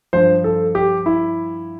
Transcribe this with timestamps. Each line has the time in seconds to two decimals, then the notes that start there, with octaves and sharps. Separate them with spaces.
0.13 G2 F3 C5
0.44 A4
0.75 G4
1.06 E4